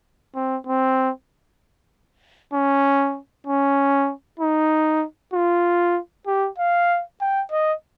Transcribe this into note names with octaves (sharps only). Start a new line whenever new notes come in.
C4
C4
C#4
C#4
D#4
F4
G4
F5
G5
D#5